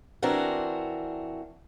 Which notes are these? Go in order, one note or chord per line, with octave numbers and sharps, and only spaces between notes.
E3 C4 D4 F#4 A#4